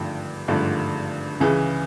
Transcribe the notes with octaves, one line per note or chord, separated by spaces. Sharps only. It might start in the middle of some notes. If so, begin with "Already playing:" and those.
Already playing: G#1 G2 D3 F3 A3 G5
G#1 G2 D3 F3 A3
C#2 C#3 E3